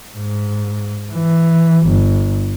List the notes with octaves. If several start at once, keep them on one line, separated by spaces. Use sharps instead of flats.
G#2
E3
G1